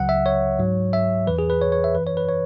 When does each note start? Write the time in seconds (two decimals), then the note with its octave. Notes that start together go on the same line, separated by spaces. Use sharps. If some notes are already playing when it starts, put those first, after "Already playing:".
Already playing: C#2 C#3 F#3 F#5
0.09 E5
0.26 C#5
0.59 G#2 F#3
0.93 E5
1.27 E2 E3 B4
1.39 G#4
1.50 B4
1.62 C#5
1.72 C#5
1.84 E5
1.95 F#2 E3 B4
2.07 C#5
2.17 B4
2.29 C#5